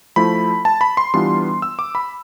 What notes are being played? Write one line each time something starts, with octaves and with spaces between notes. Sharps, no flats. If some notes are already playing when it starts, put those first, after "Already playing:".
F3 A3 E4 B5
A5
B5
C6
E3 G3 B3 D4 F4 C6
E6
D6
B5